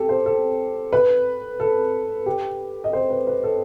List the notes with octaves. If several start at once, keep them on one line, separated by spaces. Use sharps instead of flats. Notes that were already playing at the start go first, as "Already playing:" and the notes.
Already playing: G4 A4
C5
A4
B4
A4
G4
D#5
C5
B4
B4
A4